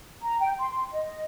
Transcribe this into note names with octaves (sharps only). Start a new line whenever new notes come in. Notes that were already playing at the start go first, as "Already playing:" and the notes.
A#5
G5
C6
D#5